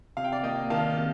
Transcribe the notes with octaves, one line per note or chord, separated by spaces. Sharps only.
C3 F5
G5
D5 F5
A#3 D#5 G5
D#3 F5 A5
C3